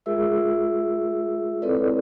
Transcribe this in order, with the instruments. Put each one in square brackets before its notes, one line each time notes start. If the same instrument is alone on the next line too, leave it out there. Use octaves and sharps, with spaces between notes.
[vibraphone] G#3 F4 G#4 A#4 E5 E6
C4 E4 A4 B4 C#5 D5